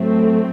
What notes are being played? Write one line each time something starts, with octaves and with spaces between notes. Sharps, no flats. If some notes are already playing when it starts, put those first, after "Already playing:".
Already playing: A2 F#3 A3 C4